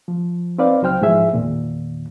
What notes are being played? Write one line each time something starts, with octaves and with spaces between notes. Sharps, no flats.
F3
C4 D#4 B4 D5 F5
C#2 F#3 C5 G5 F6
G#2 E3 F3 G#4 E5
E2 A#2 D#3